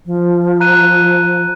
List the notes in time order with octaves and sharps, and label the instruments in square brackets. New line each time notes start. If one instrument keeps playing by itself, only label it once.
[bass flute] F3
[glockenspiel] A#5 F#6 D#7